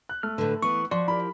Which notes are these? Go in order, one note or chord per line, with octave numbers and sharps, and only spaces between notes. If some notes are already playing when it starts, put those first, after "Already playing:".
F#6
A3 F6
A2 D3 B4
E3 B3 B4 C#6
F3 F#4 D5 C6 C#6
E4 G4 A#4 B5